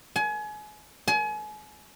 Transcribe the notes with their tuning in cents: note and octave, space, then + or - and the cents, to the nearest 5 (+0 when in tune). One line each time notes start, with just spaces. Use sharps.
G#5 +30
G#5 +35